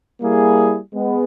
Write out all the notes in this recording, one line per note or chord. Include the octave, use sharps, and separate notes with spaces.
G3 A#3 E4 G#4
G#3 B3